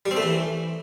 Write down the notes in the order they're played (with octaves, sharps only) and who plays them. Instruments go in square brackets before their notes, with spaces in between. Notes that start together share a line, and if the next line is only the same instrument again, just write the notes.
[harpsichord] G3
C4
A3
E3